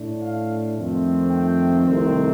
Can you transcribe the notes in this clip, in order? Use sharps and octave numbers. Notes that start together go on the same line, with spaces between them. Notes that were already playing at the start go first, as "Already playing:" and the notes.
Already playing: A2 A3 D4
F5
F2 D#3 A3 C4
G5
C2 C3 D#3 A3 C4